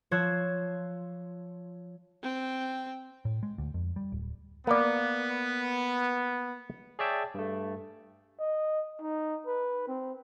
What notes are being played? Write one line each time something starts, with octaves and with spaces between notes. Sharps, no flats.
F3 C5 C#5 E6 F#6 G#6
C4 G5
A2
G#3
D2
F2
G3
D1
A#3 B3 D5
G#4 C#5 D5 E5 G5 A5
G2 A3
D#5
D#4
B4
C4